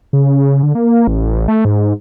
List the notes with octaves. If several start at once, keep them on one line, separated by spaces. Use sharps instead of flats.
C#3
D3
A#3
A1
A3
G#2